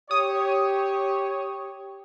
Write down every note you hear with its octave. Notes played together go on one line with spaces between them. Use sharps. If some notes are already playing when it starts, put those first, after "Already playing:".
G4 C#5 D#6